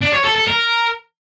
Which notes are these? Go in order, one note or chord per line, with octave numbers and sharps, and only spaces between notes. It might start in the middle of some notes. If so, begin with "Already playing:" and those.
D4
C#5
A4
A4
A#4